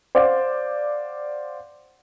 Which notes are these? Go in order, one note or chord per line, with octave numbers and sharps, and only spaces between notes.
C5 D5 F5 F#5 D6